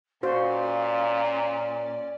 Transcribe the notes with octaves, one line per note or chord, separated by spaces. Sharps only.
A#2 C#4 F#4 C5 D5 F5